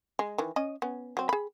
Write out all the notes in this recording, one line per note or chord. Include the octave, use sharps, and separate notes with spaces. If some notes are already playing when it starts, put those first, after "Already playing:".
G#3
D#3 E3
C#4 D#5
B3 C#4
F#3 C4
G#4 B5